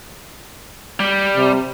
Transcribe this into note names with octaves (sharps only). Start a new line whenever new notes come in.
G3
C3